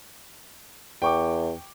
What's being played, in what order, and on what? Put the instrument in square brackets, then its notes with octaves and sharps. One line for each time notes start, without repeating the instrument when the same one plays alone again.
[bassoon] E2 [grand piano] G5 C#6 D6